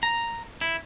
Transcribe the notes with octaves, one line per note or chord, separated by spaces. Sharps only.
A#5
E4